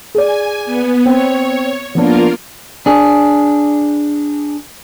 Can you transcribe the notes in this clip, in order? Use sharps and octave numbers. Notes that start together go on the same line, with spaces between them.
G#4 D5 G#5
B3
C4 C#5
F3 A#3 B3 D4 F4 A#4
D4 G#4